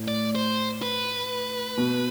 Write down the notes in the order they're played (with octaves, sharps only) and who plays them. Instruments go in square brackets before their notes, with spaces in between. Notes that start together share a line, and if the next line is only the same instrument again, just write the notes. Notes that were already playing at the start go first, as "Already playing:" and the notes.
Already playing: [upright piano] A2
[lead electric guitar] D5
C5
B4
[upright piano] B2